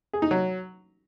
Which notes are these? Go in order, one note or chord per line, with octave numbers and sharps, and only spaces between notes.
G#4
D#4
F#3